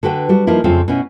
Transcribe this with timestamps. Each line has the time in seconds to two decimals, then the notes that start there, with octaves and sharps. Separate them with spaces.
0.03 D3 F#4 B4 G5
0.29 G3 F#4
0.47 F3 A#3 D#4 E4
0.64 F2 C#3 C4 F4 E5
0.88 B2 C#4 E4